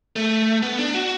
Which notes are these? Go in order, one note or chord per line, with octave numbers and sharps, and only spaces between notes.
A3
B3
D4
F#4